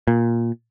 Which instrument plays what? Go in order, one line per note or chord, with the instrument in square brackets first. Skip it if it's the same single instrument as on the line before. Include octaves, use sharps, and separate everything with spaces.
[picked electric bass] A#2